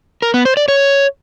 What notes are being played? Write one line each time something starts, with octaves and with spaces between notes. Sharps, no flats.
A#4
B3
C5
D5
C#5